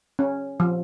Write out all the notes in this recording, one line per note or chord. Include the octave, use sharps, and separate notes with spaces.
C#4
F3